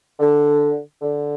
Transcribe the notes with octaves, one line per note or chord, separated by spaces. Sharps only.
D3
D3